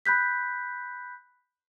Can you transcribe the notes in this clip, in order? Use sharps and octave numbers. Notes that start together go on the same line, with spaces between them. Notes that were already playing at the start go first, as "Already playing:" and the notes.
B5 F#6 G6 B6